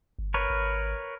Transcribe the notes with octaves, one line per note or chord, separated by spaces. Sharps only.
G1
A#4 B4 C#5
G#1